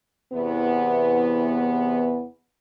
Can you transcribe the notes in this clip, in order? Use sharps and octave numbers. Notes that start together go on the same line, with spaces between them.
E2 C3 E3 B3